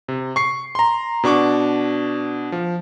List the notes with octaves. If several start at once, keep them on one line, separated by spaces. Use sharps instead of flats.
C3
C#6 C7
A#5 C6
B2 D4 C#6 D6
F3